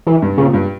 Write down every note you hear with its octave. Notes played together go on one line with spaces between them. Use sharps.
E3
G2
A#2 C#3
G2